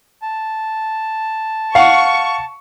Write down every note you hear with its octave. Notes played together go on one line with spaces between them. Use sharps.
A5
F5 F#5 C#6